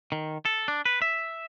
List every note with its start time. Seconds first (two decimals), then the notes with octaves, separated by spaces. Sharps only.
0.12 D#3
0.45 A4
0.68 D4
0.86 B4
1.02 E5